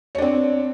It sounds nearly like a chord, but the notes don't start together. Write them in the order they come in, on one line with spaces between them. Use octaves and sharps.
C#5 D4 C4